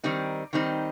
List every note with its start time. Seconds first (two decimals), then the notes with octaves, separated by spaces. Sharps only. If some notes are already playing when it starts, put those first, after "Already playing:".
0.04 D#3 G3 C4 D#4
0.53 D#3 G3 C4 D#4